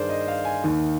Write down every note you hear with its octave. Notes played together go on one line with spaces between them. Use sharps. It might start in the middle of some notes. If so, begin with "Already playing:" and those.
Already playing: G2 D#3 G#4 A#4 C5 D5
D#5
F5
G#5
D#2 D#3